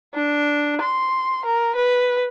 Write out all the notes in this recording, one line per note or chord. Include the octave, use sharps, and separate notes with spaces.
D4
C6
A#4
B4